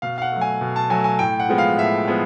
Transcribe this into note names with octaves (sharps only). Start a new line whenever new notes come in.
B2 F5
F5
F#5
F#3 A3
G#5
B2
A5
F#3 A3 G#5
G#5
A2 G5
F#5
F3 G#3 B3
F5
A2 E5
F3 G#3 B3